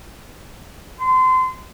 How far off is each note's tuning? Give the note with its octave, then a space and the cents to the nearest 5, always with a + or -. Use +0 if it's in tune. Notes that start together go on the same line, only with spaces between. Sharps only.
C6 -30